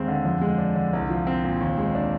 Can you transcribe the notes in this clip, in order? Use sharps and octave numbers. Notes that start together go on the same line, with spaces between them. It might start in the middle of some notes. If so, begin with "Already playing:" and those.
Already playing: D#2 G#3 C4
D3
F2
G#3
D4
D3
C2
F3
C4
A#2
D#2
G#3
D4